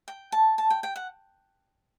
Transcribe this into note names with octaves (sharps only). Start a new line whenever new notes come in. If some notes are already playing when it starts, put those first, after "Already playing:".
G5
A5
A5
G5
G5
F#5